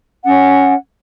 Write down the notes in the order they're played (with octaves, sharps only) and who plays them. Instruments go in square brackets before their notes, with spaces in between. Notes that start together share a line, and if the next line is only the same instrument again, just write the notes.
[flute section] C#4 F#5